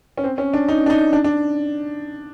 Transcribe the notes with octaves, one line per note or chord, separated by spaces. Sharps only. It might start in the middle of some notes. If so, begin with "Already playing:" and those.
C#4
C4
C#4
D4
D#4
D4
D#4
D4
D4